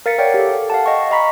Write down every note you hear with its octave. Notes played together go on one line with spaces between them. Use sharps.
A#4 F5 A6 B6 C#7
A#4 C#5 D5 F#5 G5
G4 A4
F5 F#5 A5
D#5 G5 C#6
D#5 F5 A#5 B5 C#6 B6